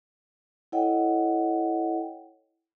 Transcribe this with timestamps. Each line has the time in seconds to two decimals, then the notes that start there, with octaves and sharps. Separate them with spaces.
0.72 E4 A4 C#5 D#5 F#5 G5